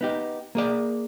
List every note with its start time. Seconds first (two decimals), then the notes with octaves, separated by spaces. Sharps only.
0.01 B3 D#4 G4
0.55 A#3 G#4 D5